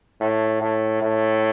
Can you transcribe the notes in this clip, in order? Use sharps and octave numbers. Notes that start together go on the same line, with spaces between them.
A2
A2
A2